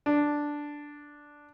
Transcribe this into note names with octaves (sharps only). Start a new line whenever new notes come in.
D4